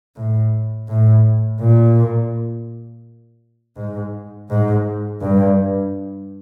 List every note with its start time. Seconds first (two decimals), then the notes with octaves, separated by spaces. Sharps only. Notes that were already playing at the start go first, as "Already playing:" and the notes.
0.16 A2
0.88 A2
1.60 A#2
3.76 G#2
4.50 G#2
5.21 G2